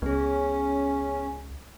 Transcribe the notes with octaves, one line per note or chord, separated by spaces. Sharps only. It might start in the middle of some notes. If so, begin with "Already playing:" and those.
C#2 B3 C#4 G#4